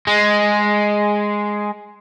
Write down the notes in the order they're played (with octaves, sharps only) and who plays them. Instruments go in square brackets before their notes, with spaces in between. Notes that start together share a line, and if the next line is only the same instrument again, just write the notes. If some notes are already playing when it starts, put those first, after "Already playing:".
[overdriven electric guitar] G#3